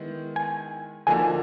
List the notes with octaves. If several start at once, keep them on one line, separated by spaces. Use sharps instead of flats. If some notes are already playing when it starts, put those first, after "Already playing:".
Already playing: D#3 G#3 B3 E4
G#5
D3 F3 A#3 D#4 F#4 G#5